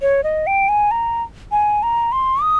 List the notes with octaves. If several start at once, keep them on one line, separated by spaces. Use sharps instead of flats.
C#5
D#5
G5
G#5
A#5
G#5
A#5
C6
D#6